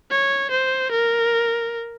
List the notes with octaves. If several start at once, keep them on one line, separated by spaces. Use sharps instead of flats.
C#5
C5
A#4